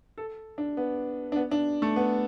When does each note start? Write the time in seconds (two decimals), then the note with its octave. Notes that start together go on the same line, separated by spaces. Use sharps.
0.18 A4
0.58 D4
0.77 B3
1.32 D4
1.36 B3
1.51 D4
1.82 A3
1.96 B3